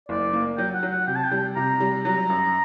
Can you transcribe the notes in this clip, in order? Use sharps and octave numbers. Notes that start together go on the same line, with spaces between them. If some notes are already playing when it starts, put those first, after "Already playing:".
F#1 D5
A#3
F#3 G5
F#5
F#3
F#5
C3 G5
A5
G5
G3
C3 A#5
G3
F#3 A#5
F#2